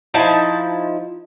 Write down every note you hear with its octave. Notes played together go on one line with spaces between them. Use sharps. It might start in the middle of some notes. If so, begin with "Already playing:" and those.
F3 D#4 E4 A5